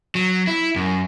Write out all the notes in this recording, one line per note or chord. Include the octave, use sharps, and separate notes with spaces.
F#3
E4
F#2